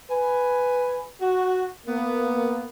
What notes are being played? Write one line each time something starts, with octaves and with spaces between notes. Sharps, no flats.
B4 G#5
F#4
A#3 B3